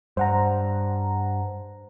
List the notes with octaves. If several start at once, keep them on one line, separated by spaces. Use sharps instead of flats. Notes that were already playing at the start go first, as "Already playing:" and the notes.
G2 C5 F#5 A#5